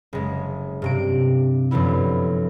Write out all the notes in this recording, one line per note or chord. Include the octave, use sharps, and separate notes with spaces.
F#1 G#3
G2 C3 D7
F#2 D3 F3 B3 E4